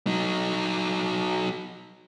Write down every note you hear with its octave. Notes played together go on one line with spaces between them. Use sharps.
F#3 D#4